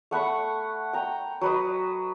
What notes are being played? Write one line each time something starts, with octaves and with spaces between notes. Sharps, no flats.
A3 F#5 B5 C#6
G5 A#5
F#3 B4 D#5